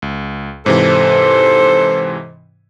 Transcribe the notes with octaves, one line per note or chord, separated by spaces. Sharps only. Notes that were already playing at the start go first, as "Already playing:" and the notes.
C#2
G#2 C3 E3 A4 C5